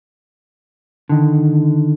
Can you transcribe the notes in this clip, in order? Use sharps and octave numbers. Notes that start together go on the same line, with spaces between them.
D3 D#3